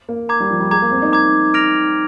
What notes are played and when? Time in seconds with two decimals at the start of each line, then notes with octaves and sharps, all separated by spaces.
0.09 A#3
0.29 A#5 D6 G#6
0.40 G3
0.50 F3
0.60 G3
0.71 G#3 A#5 D6 G#6
0.82 A#3
0.91 C4
1.02 D#4
1.13 A#5 D6 G#6
1.54 F6 A#6 D7 F7